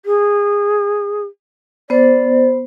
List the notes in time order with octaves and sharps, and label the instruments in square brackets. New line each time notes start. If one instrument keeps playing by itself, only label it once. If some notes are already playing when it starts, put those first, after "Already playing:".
[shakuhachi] G#4
[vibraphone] B3 C5 [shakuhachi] D5